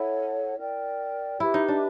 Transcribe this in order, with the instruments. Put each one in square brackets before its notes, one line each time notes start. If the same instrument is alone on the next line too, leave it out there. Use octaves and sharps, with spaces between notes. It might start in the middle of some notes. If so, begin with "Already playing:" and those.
Already playing: [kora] E4 [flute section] A4 C#5 F#5
[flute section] A#4 D5 G5
[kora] E4 [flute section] G4 B4 E5
[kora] D#4
D4